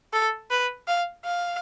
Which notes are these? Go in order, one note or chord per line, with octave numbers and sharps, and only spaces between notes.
A4
B4
F5
F5